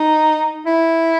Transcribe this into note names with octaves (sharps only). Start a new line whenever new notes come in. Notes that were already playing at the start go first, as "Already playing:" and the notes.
Already playing: D#4
E4